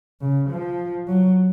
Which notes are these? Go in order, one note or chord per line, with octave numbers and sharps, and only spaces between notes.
C#3
F3
F#3